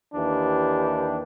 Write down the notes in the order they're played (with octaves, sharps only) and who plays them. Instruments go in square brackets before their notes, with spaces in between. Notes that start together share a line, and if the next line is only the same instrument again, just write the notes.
[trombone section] D#2 E3 D4 G4